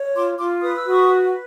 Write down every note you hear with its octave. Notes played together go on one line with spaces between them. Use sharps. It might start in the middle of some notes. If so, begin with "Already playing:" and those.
Already playing: C#5
F4 C6 D6
F4 C6 D6
B4 D#6
E6
F#4 C#6 D#6
B4